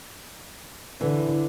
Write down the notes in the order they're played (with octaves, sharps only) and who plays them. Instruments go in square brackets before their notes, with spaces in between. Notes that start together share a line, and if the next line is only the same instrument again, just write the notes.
[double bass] D3 [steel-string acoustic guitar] E3